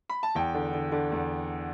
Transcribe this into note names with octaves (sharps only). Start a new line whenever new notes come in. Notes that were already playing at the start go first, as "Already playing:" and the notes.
B5
A5
E2 G5
D3
D3
D3
E2